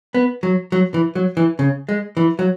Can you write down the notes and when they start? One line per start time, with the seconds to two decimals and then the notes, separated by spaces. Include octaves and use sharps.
0.14 B3
0.43 F#3
0.72 F#3
0.94 E3
1.15 F#3
1.37 E3
1.59 C#3
1.89 G#3
2.17 E3
2.39 F#3